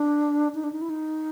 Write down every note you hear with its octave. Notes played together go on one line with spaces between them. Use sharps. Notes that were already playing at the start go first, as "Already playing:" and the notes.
Already playing: D4
D#4
D4
D#4
E4
D#4